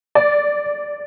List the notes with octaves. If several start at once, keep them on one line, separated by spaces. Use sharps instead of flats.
D5